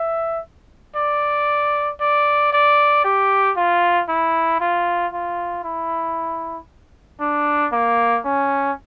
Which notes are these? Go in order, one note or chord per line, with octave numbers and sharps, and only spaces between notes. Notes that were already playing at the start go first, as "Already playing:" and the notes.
Already playing: E5
D5
D5
D5
G4
F4
E4
F4
F4
E4
D4
A#3
C#4